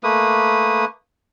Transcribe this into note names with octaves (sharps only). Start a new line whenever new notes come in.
A3 A#3 B4 D#6